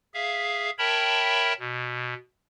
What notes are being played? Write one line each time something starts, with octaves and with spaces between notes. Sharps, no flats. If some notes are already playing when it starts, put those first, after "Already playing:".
G#4 E5 F5
A#4 C#5 E5 G5 A5 B5
B2